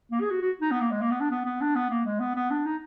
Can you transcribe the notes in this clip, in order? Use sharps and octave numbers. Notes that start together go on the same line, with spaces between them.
A#3
G#4
F#4
F#4
D#4
B3
A#3
G#3
A#3
B3
D4
B3
B3
D4
B3
A#3
G#3
B3
B3
D4
D#4